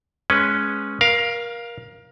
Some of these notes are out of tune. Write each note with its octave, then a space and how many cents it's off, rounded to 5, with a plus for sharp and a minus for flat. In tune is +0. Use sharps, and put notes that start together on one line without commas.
G#3 +10 C#4 +0 B4 +0
A#4 +25 F5 +0